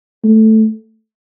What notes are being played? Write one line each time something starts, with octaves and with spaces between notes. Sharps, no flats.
A3